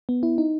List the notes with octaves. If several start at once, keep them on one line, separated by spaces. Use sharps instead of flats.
B3
E4
D#4